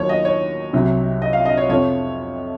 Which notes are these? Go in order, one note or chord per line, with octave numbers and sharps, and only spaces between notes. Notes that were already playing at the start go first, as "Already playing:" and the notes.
Already playing: D#2 D#3 F#3 C#5
D#5
C#5
C2 C3 F#3
D#5
F5
D#5
C#5
F2 C3 F3 C#5